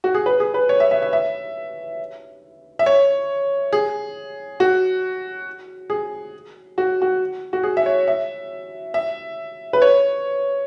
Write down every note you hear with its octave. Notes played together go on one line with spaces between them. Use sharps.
F#4
G#4
B4
G#4
B4
C#5
E5
E5
E5
E5
E5
C#5
G#4
F#4
G#4
F#4
F#4
F#4
G#4
E5
C#5
E5
E5
B4
C#5